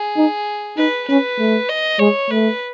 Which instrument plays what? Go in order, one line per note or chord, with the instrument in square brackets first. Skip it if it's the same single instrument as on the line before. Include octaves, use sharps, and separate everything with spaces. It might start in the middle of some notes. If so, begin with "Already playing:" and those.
Already playing: [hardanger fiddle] G#4
[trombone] D#4
[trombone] D#4 [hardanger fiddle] B4
[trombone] C#4 [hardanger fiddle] B4
[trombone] A3
[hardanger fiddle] D#5
[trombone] G#3 [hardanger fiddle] C#5
[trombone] A3 [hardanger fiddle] B4